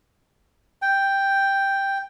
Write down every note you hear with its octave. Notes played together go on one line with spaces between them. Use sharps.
G5